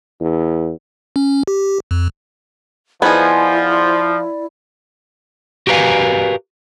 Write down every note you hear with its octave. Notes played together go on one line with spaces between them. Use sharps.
E2
C#4
G4
F2
F3 B3 D#4 E4 G#4 D5 G#5 B5
F#4 G4 A#4 B4 F5 G#5